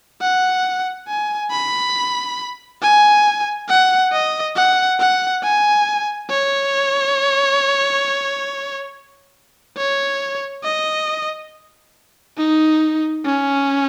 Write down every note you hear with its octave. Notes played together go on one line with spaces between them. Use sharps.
F#5
G#5
B5
G#5
F#5
D#5
F#5
F#5
G#5
C#5
C#5
D#5
D#4
C#4